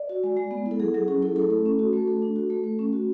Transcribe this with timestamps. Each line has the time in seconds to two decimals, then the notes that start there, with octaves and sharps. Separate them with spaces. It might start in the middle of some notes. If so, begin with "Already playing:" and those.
Already playing: D5
0.09 F#4
0.24 G#3
0.37 G#3
0.51 B3
0.66 E4
0.71 A4
0.80 F#3 G#4
0.94 F#3 G#4
1.08 C#4 G#4
1.22 E4 A4
1.36 A3 A4
1.50 A3
1.66 C#4
1.79 F#4
1.93 A3 A4
2.08 A3
2.22 D4
2.36 F#4
2.50 A3
2.64 A3
2.79 C#4
2.93 F#4